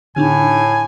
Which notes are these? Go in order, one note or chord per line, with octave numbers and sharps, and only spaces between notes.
A2 D3 D4 D#4 G#5